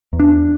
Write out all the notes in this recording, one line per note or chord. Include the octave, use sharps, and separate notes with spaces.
E2
D4